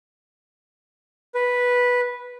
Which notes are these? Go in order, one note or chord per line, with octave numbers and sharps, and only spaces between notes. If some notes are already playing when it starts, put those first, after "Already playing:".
B4